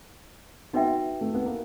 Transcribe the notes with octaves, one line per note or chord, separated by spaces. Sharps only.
B3 D#4 F#4 B4 E5 G5
A3
B3
A#3